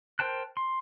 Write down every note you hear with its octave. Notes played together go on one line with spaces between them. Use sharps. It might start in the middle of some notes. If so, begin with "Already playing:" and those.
A#4 C5 G5 A5 F#6
C6